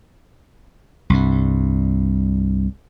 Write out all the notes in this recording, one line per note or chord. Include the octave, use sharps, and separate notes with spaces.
C2 G2